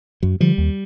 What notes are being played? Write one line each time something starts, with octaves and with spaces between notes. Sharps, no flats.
F#2 F#3
D3 F3 G3
D#2